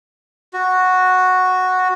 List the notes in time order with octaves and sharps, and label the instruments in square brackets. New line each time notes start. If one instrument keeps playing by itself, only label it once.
[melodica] F#4